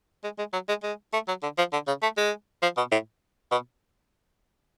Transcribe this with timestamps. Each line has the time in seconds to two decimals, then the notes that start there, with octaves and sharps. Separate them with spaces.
0.24 G#3
0.39 G#3
0.53 F#3
0.68 G#3
0.83 G#3
1.13 A3
1.28 F#3
1.43 D3
1.58 F3
1.73 D3
1.87 C#3
2.03 A3
2.17 G#3
2.63 F3
2.77 B2
2.92 A2
3.52 B2